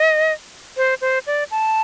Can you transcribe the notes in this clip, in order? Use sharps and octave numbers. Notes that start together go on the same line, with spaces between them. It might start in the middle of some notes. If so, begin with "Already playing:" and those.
Already playing: D#5
C5
C5
D5
A5